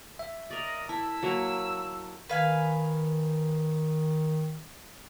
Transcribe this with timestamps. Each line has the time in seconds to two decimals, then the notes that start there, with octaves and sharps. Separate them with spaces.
0.19 E5
0.50 A#4 D5 D#5
0.89 E4 A5 E6
1.23 F#3 A#3 E4
2.29 D#3 B4 F5 G#5